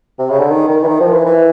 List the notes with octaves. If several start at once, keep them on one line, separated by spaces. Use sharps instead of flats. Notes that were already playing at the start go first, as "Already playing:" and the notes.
C3
C#3
D3
D#3
D#3
E3
D#3
F3
E3
E3